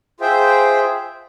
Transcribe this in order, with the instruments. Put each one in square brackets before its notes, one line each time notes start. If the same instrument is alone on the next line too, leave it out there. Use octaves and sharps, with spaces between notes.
[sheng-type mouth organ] F4 G#4 C5 E5 G5